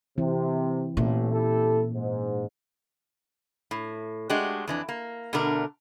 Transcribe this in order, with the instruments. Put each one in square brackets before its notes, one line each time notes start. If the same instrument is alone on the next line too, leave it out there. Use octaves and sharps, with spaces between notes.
[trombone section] C3 [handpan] E3 C4 E4
[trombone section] A1 A3 [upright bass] A#2 [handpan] C#4
[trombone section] E4 G4 A4
G#2
[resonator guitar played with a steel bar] A2
G#3 A3 D4 F#4 G4
F2 E3 D4
A#3
B2 D3 A3 D4 A#4